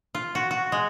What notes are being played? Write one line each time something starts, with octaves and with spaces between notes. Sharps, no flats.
F4
F#4
F#4
G#3